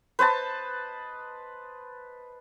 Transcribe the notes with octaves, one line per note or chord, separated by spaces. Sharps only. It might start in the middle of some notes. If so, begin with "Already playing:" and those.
B4 C5 D#5 A5